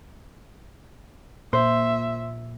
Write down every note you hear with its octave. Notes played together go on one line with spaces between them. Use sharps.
A#2 C5 E5